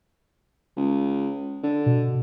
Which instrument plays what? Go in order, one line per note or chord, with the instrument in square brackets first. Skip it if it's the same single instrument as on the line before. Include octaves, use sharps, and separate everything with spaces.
[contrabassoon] C#2
D3
[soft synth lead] B2